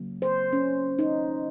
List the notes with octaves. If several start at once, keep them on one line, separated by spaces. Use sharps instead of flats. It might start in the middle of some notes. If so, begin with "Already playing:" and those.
Already playing: C#3 F#3 A#3
C5
C#4
D#4